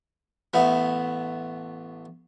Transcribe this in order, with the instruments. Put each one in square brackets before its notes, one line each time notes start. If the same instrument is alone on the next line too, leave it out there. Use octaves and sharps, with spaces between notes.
[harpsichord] A1 A3 B3